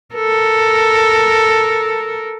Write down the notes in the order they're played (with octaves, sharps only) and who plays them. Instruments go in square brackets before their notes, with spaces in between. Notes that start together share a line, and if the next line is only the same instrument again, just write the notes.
[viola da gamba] A4 A#4